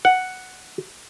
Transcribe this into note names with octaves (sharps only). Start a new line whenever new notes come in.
F#5